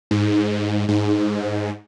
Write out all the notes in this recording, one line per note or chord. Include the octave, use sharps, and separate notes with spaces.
G#2
G#2